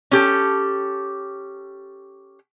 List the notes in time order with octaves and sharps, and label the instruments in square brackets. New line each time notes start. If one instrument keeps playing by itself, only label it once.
[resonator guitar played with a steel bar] C#4 G4 A4